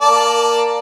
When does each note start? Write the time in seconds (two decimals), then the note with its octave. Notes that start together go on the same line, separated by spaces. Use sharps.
0.02 A#3 D5 A5